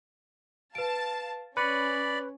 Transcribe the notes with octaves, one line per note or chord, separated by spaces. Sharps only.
B4 F5 A5 D7
C#4 B4 D5 B5 C#7